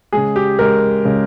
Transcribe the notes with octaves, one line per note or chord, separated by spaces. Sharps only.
C#3 G#3 G#4
G4
C#3 G#3 A#4
C#3 G#3